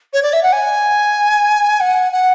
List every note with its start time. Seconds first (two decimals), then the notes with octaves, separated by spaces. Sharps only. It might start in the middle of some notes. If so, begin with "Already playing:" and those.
0.13 C#5
0.23 D5
0.33 E5
0.43 F#5
0.52 G#5
1.80 F#5
2.12 F#5